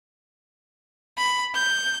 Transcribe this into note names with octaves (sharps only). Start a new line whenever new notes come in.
B5
G6